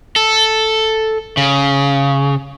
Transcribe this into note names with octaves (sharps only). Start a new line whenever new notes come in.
A4
C#3